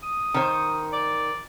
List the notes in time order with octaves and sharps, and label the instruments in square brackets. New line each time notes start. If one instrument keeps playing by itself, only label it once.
[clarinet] D#6
[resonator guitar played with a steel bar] D#3 C5
[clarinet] D5